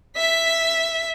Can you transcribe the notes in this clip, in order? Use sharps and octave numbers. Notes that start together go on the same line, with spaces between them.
E5 B6